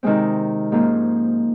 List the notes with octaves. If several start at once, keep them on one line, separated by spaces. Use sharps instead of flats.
C3 D#3 G#3 C4
G#2 F3 A#3 C#4 F4